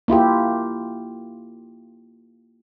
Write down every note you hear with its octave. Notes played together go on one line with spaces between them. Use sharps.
A#3 E4 F4 G4